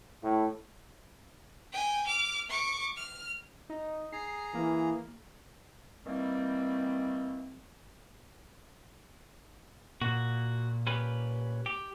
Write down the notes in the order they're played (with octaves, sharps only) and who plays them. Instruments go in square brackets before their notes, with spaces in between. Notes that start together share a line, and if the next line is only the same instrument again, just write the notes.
[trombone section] A2
[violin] G5 G#5
D6 F6
C#6 D6
F6
[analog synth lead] D#4
[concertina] G#4 A#5 [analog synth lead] C7
[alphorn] E3 [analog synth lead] A#3
[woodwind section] D#3 E3 G3 A#3 C4
[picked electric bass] A#2 [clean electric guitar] F#4
[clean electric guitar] C#4 G4 B4
G4